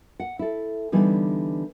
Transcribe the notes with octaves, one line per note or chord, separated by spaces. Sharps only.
F#5
E4 A4
D3 E3 G3 B3 D#4